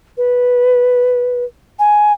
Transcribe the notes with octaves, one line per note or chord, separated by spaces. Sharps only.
B4
G#5